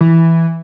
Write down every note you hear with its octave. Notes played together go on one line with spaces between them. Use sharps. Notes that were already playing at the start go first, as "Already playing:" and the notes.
E3